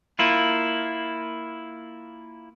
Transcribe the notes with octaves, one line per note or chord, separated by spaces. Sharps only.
A#3 E4 F4